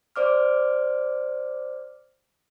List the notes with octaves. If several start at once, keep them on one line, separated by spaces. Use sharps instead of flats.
C5 D5 D6 F6